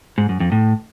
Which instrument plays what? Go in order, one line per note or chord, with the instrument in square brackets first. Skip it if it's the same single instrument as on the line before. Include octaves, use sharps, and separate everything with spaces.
[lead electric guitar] G#2
F#2
F2
A2